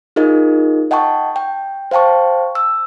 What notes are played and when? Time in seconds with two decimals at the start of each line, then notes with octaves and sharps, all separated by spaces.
0.16 D#4 F4 G#4 A#4 D#5
0.91 D#5 F#5 G5 A5 C#6
1.36 G5
1.91 C5 F5 G5 A5 C#6
2.55 E6